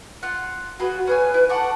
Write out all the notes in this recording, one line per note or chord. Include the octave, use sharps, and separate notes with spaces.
F4 F#5
F4 F#4 G#4 B4
C#4 G#4 B4 G#5
E4
A4 D5 F#5 C#6